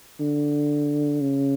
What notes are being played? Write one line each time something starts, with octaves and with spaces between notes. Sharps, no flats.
D3
C#3